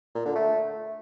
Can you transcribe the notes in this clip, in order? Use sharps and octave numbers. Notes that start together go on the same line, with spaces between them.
A#2
D3
A3